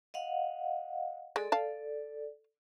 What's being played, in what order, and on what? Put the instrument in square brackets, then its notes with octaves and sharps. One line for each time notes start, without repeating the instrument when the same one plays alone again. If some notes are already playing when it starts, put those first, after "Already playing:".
[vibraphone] D#5 F5 F#5
[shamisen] G#3 [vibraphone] A4 D5
[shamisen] F5 A5